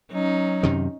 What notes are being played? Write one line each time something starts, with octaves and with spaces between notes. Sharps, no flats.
F#3 C#4 D#4
F#2 C3 D#3